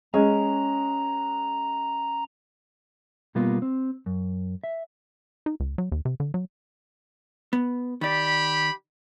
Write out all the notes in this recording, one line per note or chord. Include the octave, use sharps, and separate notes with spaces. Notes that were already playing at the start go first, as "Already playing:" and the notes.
G#3 C#4 A#5
B2 G3 A#3 B3 F4
C4
F#2
E5
D#4
C#2
F#3
D#2
C3
D3
F#3
B3
D#3 G4 D5 B5